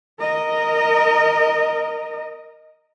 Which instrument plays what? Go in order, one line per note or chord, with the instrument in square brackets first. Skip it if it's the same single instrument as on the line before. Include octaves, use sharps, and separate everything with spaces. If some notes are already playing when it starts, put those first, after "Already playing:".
[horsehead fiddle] A#4 D#5